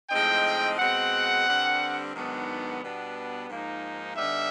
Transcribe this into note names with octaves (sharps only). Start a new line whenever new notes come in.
A2 F3 G#3 C4 D#4 G5
B2 G#3 C4 F#5
G2 D3 G3 C4
G#2 D#3 F#3 B3 D4
B2 G3 B3 D4
G#2 F3 A#3 D#4
D3 G3 B3 D#4 E5